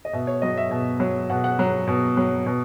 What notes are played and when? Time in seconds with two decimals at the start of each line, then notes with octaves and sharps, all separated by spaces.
0.05 D#5
0.13 B2 E5
0.27 C#5
0.42 F#3 D#5
0.57 E5
0.71 B2
1.00 F#3
1.30 B2 F#5
1.44 F#5
1.59 F#3 A#5
1.87 B2
2.17 F#3
2.46 B2